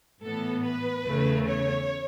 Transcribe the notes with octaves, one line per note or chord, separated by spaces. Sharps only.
A2 E3 B3 A4
B4
E2 C#3 A3
C#5